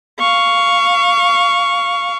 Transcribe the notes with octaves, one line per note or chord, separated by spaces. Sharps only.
F5 C#6